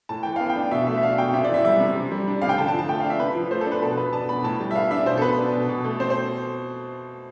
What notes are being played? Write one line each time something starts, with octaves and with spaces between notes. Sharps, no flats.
A2 A5
E3 G5
B3 F5
G5
D4
B2 E5
A3 E5
E5
D4 F5
B2 G5
C3 E5
D5
E3 E5
G3 E5
C3
C3
G3
D4
C3 F5
G5
D3 A5
A5
F3
A5
A3 G5
F5
D4
E5
C3 B4
F3
A3 C5
A4
D4
B4
B2 A4
B3 B4
D4 A5
B2 B5
A2 A5
G3
E5
B3 F5
D4 E5
B2 C5
A4
B3 B4
D4
B2
B2
A3
C4 C5
C5